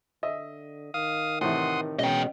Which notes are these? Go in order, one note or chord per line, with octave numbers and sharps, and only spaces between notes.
D3 D#5 E5
D#3 F5 D#6
A2 C3 E3 F#5 C6 D#6
B2 G#3 C#4 D#5 G5